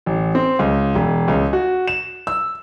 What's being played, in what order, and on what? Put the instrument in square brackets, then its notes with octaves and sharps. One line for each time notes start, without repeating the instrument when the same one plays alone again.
[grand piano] A1
C4
C#2
E1
C#2
F#4
E7
E6